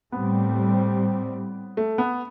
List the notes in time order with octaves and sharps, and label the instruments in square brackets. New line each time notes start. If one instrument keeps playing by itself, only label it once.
[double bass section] A2 G3 C4 [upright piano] B3
[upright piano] A3
B3